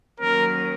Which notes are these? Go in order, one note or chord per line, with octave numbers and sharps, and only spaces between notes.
D#3 F#3 A#3 C#4 A#4